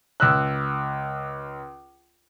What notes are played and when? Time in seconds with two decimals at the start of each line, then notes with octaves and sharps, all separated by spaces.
0.20 C#2 E6 F#6